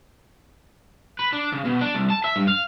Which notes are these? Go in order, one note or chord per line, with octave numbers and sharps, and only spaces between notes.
B4
D4
C#3
B2
D4
C2
A5
E5
G2
F5